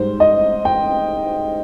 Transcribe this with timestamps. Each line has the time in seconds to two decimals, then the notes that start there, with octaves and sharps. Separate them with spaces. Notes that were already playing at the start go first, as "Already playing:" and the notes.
Already playing: G#2 G3 C5
0.20 D#5
0.65 G5